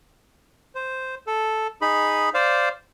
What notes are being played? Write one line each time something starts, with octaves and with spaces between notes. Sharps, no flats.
C5
A4
D#4 G#4 B5
C5 D5 F5